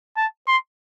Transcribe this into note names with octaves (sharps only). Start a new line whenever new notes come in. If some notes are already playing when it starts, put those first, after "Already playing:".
A5
C6